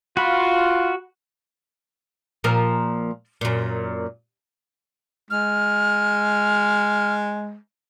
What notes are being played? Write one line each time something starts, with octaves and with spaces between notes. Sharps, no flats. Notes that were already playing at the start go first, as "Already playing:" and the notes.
F4 F#4 B5
A#2 F3 A#4
F#2 A#2
G#3 F6